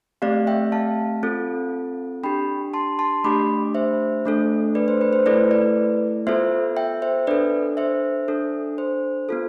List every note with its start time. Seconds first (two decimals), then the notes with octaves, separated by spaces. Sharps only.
0.22 A3 C4 G4 D5 F5
0.47 E5 G5
0.72 F5 A5
1.23 C4 F4 A4
2.23 D4 G4 G5 B5
2.74 A5 C6
2.99 A5 C6
3.24 A3 D4 G4 B5 D6
3.74 C5 E5
4.25 A3 D4 A4
4.75 B4 D5
4.88 C5
5.01 B4
5.13 C5
5.26 A3 E4 A4 B4 D5
5.51 B4 D5
6.27 B3 F4 A4 C5 E5
6.77 E5 G5
7.02 C5 E5
7.27 D4 A4 B4 D5
7.77 C5 E5
8.28 D4 A4
8.78 C5
9.29 B3 F4 A4